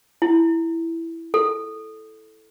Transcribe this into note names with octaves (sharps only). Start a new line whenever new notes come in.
E4
A4